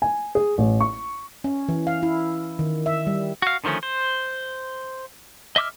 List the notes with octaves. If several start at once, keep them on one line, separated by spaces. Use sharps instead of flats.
G#5
G#4
A1
C#6
C#4
E3
F5
E4
D#3
E5
G3
F#4 F5
D3 D#3 F3 A3 C#4
C5
D#5 E5 D6 E6 F6